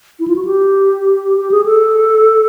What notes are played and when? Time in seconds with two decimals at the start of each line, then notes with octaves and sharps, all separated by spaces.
0.20 E4
0.28 F4
0.36 F#4
0.45 G4
1.38 G4
1.52 G#4
1.65 A4